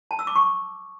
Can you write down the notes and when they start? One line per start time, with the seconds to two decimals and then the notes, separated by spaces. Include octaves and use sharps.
0.11 A5
0.19 E6
0.27 D6
0.35 C#6